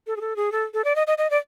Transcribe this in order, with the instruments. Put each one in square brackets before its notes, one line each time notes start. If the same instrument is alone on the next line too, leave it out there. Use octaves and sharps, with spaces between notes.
[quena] A4
G#4
A4
G#4
A4
A4
D5
D#5
D#5
D#5
D5